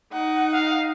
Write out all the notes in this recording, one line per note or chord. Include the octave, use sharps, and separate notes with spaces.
D#4 F#5
F5